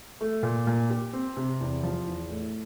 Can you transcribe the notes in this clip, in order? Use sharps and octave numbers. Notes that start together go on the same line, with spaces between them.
A3
A#2
A#2
G4
C4
C3
E2
F3
E2
A2